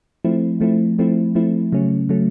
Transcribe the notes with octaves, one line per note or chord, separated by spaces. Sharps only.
F3 A3 C4 E4
F3 A3 C4 E4
F3 A3 C4 E4
F3 A3 C4 E4
C#3 F#3 A3 C#4
C#3 F#3 A3 C#4